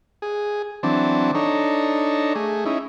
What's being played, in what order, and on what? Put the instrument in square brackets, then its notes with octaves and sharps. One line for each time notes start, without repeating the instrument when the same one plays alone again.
[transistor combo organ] G#4
E3 F#3 C4 D4 A5
D4 D#4 A4 C#5 A#5
A3 G#4
C#4 D#4 E4